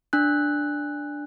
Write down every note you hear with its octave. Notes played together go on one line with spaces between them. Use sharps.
D4 F#6